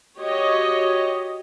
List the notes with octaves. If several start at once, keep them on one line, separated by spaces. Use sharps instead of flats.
F#4 G4 C#5 D#5